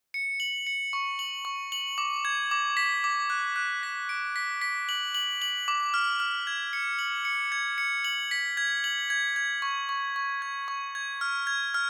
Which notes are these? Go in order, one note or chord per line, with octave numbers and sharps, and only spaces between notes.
C#7
F#7
C#7
C#6
F#7
C#6
F#7
D6
G#6
D6
B6
D6
F#6
F#6
B6
D7
B6
B6
F#7
F#7
F#7
D6
F6
F6
G#6
C#7
F#7
C#7
G#6
C#7
F#7
B6
G#6
F#7
G#6
G#6
C#6
C#6
C#6
G#6
C#6
G#6
F6
G#6
F6